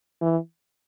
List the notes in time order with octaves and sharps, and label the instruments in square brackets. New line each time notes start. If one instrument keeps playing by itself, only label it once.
[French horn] E3